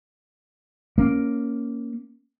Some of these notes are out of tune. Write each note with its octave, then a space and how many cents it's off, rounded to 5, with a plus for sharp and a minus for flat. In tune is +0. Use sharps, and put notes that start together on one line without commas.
A#3 +0 C#4 +0